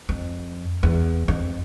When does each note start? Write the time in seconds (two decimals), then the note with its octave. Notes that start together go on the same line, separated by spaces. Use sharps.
0.09 F2
0.83 E2
1.28 F2